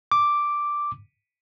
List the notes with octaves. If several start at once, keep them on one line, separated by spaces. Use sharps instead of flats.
D6